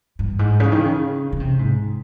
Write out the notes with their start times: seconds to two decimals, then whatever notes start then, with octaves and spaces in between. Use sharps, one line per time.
0.19 G2
0.39 G#2
0.60 C#3
0.72 D#3
0.85 C#3
1.32 C#3
1.40 C3
1.59 G#2